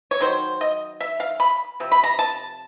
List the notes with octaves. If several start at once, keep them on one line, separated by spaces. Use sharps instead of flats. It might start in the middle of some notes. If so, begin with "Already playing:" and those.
C#5
D#3 F#3 C5
D#5
E5
F5
B5
C3 F3
B5
A#5
A5